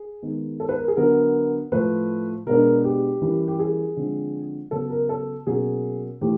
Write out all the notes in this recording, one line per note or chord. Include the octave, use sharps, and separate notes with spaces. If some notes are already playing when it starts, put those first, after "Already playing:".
Already playing: G#4
D#3 G#3 B3
A4
B4
A#4
G#4
D3 F#3 B3 A#4
A2 F3 A3 B4
B2 G#3 B3 D4 A#4
G4
E3 G3 A#3 C#4
G4
G#4
D3 F3 G#3 C4
C#3 F#3 B3 A4
A#4
A4
B2 F#3 A#3 C#4 G#4
A2 E3 A3 G4